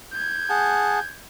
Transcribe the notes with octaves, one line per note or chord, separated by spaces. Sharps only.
G6 G#6
G#4 F#5 A5